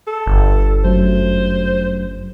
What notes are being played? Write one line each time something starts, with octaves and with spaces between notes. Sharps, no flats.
A4
G1
F#2 F#3 A3 C5